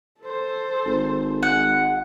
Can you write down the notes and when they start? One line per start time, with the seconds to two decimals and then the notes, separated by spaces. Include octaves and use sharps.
0.21 A4 C5
0.85 G#1
1.43 G#3 F#5